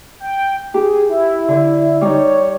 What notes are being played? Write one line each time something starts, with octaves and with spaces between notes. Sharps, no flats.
G5
G4 G#4
E4
D3
G3 D#4 C#5